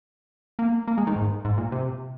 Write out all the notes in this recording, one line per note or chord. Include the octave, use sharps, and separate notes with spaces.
A#3
A#3
G#3
D#3
G#2
G#2
A#2
C3